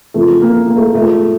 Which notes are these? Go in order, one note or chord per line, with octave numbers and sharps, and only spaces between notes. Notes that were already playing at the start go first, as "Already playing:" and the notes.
F2 C#3 F3 G#3 A3
A#3
A#3
A3
G#2 F3 G#3 A3